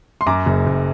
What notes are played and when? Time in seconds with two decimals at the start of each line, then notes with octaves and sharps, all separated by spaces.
0.21 C6
0.26 F#2 A#5 D6
0.46 F#1
0.67 F#1